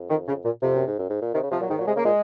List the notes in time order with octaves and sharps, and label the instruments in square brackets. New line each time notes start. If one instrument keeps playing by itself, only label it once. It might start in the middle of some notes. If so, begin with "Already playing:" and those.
Already playing: [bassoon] F2
[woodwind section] D#3
C#3
A#2
[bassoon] F2 [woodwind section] C3
[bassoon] F#2
G#2
F#2
G#2
A#2
[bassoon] C3 [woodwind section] D#3
[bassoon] C#3
[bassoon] C3 [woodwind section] F3
[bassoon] A#2 [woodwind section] F#3
[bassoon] G#2 [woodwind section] D#3
[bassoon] A#2 [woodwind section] F#3
[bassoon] C3 [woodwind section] G#3
[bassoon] C#3 [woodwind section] A#3
[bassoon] A#2 [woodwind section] G#3